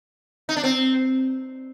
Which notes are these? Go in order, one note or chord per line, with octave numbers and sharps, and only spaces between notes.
D#4
D4
C4